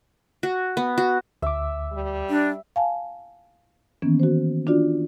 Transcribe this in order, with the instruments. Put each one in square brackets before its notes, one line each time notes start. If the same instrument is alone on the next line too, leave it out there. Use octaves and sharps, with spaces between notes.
[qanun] F#4
B3
F#4
[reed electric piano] D2 D6 [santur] E5
[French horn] G3
[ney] D4
[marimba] F5 G#5 A5
D#3 E3 A#3 B3 C#4
F#4 C5
D4 F4 F#4 D5